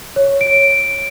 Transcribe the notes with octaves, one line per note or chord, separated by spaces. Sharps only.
C#5
D7